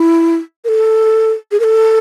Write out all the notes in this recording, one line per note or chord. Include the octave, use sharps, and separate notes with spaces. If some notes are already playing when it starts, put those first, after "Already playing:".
Already playing: E4
A#4
A4
G#4
A#4
A4